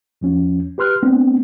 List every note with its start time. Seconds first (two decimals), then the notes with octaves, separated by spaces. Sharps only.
0.21 E2 F3 C#4
0.78 G4 B4 C6 F6 F#6
1.03 A3 B3 C4 D4